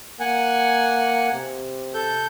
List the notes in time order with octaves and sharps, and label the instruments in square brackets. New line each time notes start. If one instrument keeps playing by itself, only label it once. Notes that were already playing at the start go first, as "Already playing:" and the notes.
[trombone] A#3 [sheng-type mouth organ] F#5 G#5
[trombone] C3
[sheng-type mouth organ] A4 G6